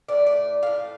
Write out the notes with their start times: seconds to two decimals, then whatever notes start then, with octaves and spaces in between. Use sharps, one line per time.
0.09 A2 A3 D5
0.27 D5
0.62 A2 A3 F5